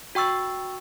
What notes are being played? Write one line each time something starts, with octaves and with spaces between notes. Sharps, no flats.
F#4 G5 C#6 E6 A6